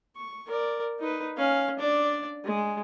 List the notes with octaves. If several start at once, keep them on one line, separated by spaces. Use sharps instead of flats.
C#6
A#4 D5
D#4 B4
C#4 F5
D4 D5
G#3